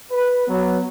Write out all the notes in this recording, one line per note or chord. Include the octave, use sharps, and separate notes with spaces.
B4
F#3 B3